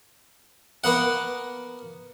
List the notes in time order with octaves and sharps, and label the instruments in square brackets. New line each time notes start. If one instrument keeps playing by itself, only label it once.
[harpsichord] A#3 B3 F#5